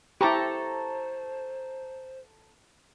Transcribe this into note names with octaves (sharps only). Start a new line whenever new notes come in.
E4 G4 A4 C5 A#5 C#6